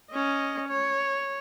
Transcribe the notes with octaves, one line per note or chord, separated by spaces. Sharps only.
C#4 D#5
C#5